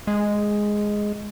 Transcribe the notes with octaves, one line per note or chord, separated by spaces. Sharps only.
G#3